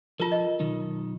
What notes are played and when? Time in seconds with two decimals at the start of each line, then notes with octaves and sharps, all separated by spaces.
0.20 F3 F4 A4 A#4
0.32 D#5
0.60 B1 D#3